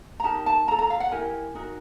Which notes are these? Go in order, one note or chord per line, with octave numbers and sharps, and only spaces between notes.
A#5
D#4 G4 A#4 A5
A5
F4 A4 A#5
A#5
F5
F#5
E4 G4 A#4 G#5
D#4 F#4 A#4